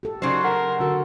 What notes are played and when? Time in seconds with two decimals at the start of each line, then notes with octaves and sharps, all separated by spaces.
0.03 G4 A4
0.22 C#3 F#3 D#4 F#4 C5
0.44 A#4 F#5
0.80 D3 F#4 A4 A#4